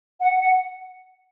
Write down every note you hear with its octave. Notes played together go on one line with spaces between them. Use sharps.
F#5
F#5